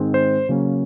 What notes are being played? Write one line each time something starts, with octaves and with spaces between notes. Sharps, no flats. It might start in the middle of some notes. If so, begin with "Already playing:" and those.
Already playing: G#2 D#3 G#3 C4
C5
C#3 F#3 A#3 C#4